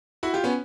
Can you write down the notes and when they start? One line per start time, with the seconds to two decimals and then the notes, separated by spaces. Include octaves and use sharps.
0.23 E4 F#4
0.34 F4 G4
0.44 B3 C#4